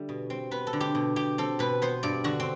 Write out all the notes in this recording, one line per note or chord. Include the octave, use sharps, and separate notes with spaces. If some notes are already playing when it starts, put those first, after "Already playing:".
Already playing: D3 G3 A3 E5
B2
C4
B3 B4
A4
D3
G4
B2
B2 G4
C4 A4
B2 B4
B3 C5
G2 D5
D3 F#4
C4